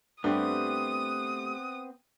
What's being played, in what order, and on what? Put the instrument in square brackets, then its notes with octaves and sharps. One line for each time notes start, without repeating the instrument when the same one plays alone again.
[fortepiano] G2 [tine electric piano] A3 G4 [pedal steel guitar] B3 C4 [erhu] D#6